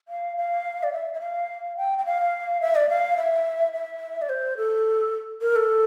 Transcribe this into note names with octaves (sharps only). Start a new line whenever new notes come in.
F5
F5
D5
E5
E5
F5
G5
G5
F5
E5
D5
F5
E5
E5
D5
C5
A4
A#4
A4